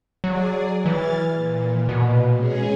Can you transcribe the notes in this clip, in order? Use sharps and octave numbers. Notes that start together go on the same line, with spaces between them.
F#3 G#4 D5
E3 F6 G#6 A6
A#2
B2
G#3 C#4 G#4